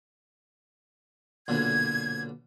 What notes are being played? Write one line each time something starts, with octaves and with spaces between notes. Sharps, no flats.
B1 A#2 D3 G#6